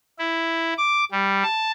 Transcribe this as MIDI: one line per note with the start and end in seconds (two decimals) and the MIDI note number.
0.19 0.74 64
0.78 1.05 86
1.11 1.43 55
1.44 1.72 81